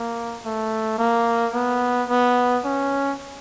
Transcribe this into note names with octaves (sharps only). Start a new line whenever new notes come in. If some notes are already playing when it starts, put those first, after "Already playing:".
Already playing: A#3
A3
A#3
B3
B3
C#4